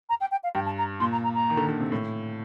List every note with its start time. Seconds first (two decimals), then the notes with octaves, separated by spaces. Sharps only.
0.09 A#5
0.20 G5
0.31 G5
0.43 F5
0.55 G2 G5
0.66 A5
0.78 A#5
1.00 A#2 C6
1.12 A#5
1.23 A#5
1.34 A#5
1.50 D#3
1.57 D3
1.69 D3
1.80 C3
1.92 A2